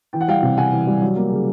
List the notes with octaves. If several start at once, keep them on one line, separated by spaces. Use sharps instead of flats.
E3 G5
F#5
G3 F5 G5
C3
C3 F#5 G#5
E3
G3
F#3
A#3
C#3